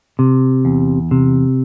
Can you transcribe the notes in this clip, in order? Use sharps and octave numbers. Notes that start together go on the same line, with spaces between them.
C3
E2
C3